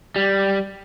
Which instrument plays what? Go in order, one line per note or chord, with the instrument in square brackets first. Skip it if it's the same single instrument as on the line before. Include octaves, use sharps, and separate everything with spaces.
[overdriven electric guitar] G3